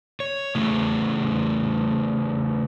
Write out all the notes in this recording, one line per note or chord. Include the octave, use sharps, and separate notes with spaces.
C#5
C#3 E3 A3